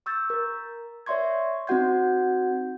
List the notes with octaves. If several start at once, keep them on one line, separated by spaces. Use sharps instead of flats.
C#6 E6 G6 A6
A#4
C#5 D5 E5 C6 C#6 G#6
C4 D#4 F#4 F#5 G6 G#6